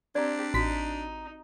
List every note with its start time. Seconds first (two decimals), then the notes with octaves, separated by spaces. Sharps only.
0.15 C4 D4 G4 D5 A#5
0.54 A1 D#4 F#4 B6